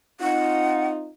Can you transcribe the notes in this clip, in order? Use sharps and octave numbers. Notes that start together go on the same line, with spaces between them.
C4 D#4 F4 F#5